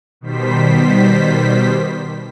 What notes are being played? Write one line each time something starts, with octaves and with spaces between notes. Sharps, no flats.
B2 D#3 G3 C5 B6